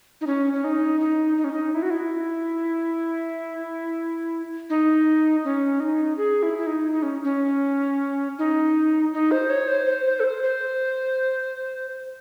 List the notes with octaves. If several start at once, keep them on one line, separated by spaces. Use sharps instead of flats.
D#4
C#4
C#4
D#4
D#4
D#4
C#4
D#4
E4
F#4
E4
D#4
C#4
D#4
G#4
E4
E4
D#4
D#4
C#4
C#4
D#4
D#4
C5
C#5
C5
C5
C5
A4
C5
C5